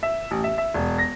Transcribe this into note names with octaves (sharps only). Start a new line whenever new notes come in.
E5
A1
E5
E5
E1
A#6